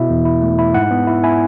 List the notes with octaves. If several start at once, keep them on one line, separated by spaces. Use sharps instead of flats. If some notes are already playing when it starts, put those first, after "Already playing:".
Already playing: B2 E4 E5
E2
E4
A3
E4
G#2 F#5
B3
E4
E4 G#5